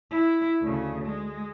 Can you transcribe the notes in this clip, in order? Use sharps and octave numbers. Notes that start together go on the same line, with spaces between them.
E4
D2 C#3
G#3